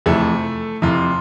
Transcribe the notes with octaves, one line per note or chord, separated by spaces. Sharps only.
F2 C3 E3 A3 A4
F2 C3 E3 F3 F4